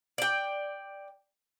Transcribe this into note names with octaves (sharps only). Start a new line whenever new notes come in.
D5 G5